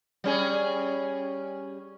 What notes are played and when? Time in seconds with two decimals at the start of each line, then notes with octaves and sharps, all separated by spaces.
0.24 G3 C#4 G#4